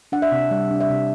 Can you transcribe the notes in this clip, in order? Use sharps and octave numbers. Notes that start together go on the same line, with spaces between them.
D4 F#5
E5
C3
G3
D4
E5
C3